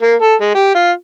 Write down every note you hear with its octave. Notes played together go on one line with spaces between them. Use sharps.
A#3
A4
G#3
G4
F4